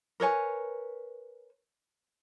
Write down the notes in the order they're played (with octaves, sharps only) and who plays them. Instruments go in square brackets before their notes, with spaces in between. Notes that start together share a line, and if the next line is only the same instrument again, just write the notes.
[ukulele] A#4 B4 C#5 G#5